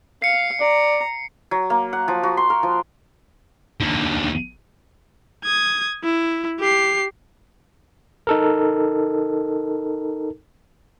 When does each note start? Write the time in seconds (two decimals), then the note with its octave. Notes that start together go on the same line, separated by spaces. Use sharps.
0.22 F5 C7 C#7
0.61 D5 A#5
1.51 F#3
1.70 A#3
1.93 F#5
2.08 F3
2.23 F#4
2.37 C6
2.50 A#4
2.63 F3
3.81 D#2 D3
5.44 D#6 G#6
6.03 E4
6.60 G4 C7
8.27 D#4 A4 A#4